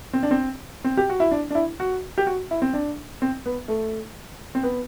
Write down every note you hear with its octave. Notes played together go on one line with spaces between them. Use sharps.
C4
D4
C4
C4
G4
F#4
E4
D4
D4
E4
F#4
G4
F#4
E4
C4
D4
C4
B3
A3
C4
B3